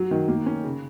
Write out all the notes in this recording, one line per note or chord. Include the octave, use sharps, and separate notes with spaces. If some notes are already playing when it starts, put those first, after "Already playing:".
Already playing: F#3
D#3
A#3
C#4
C#3